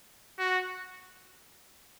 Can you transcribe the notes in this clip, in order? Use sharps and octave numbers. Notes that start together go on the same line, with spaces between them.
F#4